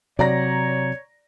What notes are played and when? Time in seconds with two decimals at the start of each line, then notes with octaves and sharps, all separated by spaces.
0.19 C3 F#3 C#5 D5 A#5 A#6